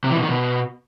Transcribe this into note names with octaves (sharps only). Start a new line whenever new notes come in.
C3
E3
B2
D#3
B2